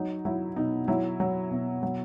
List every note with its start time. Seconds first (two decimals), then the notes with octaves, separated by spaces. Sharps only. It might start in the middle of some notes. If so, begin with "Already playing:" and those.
Already playing: F#3 D#4
0.25 F#3 E4
0.56 B2 D#4
0.88 F#3 E4
1.20 F#3
1.51 B2
1.83 F#3